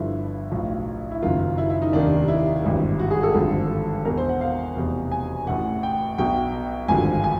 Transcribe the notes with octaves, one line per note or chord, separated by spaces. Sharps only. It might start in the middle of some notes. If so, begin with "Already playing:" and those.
Already playing: G1 G2 D3 F3 E4
B1 A2 F3
E4
F#1 F#2 D#3 F4
E4
E4
D#4
F1 D#2 D#3 D4
E4
G#1 G2 E3
F#4
G#4
A4
G#1 G2 D3 F3
E2 B2 A#4
C5
F#5
F5
F1 E2 B2
G#5
A1 A2 E3 F#5
G5
B1 B2 G5
G#1 G2 D3 F3 G#5
G#5